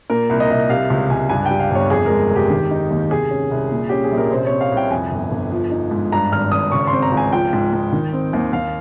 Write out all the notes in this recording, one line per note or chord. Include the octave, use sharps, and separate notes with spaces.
A#2 A#4
C2
D#5
C2
C3 F5
C#2
C#2 G#5
G2 G#5
G3 G5
F5
G1 C#5
F2 G#4
G#3 A#4
F1
G4
D#3
D#4
D#2
C3 G#4
C#4
C2
A#2
C#4 G4
G#4
A#1
A#4
C3 C5
C4 C#5
F5
C2 G5
F2 G#5
G1
G1
F3
D#4
G#2
G2 A#5
G#1 F6
G#1 D#6
C#3 C#6
C6
C4
A#5
C#2
G#5
F3 G5
G#2
G#2
D#3
C4
D#2
D#2 F5